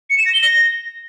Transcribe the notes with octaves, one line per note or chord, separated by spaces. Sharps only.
C#7
E7
A#6
G7
A#6